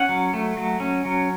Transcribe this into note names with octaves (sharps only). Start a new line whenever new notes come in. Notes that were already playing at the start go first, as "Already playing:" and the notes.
Already playing: C#4 F#5
F#3
A3
F#3
C#4
F#3